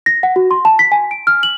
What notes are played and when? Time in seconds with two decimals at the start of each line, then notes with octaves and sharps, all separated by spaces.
0.06 A#6
0.23 F#5
0.36 F#4
0.51 C6
0.65 A5
0.79 B6
0.92 G#5
1.11 D7
1.27 F6
1.43 F#7